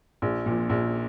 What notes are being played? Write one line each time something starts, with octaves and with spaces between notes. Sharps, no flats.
A#1
A#2 F3
A#1